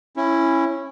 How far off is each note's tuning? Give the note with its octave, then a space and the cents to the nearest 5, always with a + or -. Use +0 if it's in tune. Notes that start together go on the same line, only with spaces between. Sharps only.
C#4 -15 E4 +10